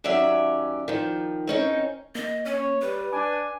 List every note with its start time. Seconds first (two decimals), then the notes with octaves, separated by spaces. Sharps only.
0.04 D#2 F#3 C#4 D5 E5
0.88 D#3 F3
1.47 C4 C#4 D#4
2.15 A#3 D#5
2.45 C#4 C#5
2.81 G3 B4
3.13 D4 G#5 D6